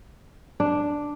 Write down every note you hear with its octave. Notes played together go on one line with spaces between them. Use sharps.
D4